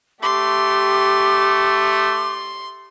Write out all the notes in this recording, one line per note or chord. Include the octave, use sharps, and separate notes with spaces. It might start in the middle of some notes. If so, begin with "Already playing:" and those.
A3 G4 C6 D6